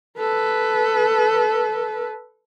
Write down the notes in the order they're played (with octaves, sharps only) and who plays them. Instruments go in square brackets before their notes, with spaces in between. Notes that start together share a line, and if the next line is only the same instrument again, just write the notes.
[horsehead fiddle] A4 B4